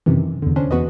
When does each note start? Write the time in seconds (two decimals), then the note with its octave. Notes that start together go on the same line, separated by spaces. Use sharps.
0.06 F#2 C3 D#3 E3
0.42 E2 D3
0.56 C#4 D4 C5
0.71 E2 F#4 B4 D#5